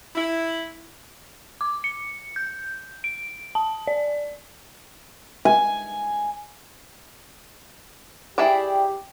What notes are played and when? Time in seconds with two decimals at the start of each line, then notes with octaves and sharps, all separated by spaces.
0.15 E4
1.61 D6
1.84 C#7
2.36 G6
3.04 D7
3.55 A5
3.87 D5
5.45 G#5
8.38 E4 G4 G#4 D5 G5